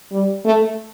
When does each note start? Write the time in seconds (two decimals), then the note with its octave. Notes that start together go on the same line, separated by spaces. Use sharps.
0.12 G3
0.45 A3